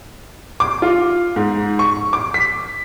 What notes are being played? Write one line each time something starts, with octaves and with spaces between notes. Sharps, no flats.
D6
F4
G#2
C#6
D6
B6